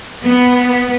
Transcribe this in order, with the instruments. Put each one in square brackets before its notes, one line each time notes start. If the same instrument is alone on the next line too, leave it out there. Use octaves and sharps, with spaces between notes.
[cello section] B3